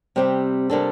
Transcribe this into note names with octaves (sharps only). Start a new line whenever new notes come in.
C3 G3 C4 G4
C3 G3 A#3 D4 A4